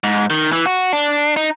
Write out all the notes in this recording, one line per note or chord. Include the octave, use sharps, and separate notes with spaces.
G#2
D#3
E3
F#4
D4
D#4